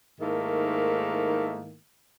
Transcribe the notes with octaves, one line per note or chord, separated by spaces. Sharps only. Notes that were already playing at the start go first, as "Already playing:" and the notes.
G#2 D#3 A3 A#3 E4